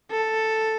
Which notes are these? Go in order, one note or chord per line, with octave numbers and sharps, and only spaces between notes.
A4